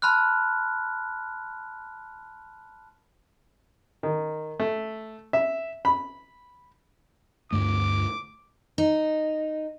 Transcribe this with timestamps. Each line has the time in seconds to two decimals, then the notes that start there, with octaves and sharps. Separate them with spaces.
0.02 A5 B5 C6 F6 F#6
4.03 D#3
4.60 A3
5.33 E5
5.85 B5
7.52 D2 G2 A3 D6
8.78 D#4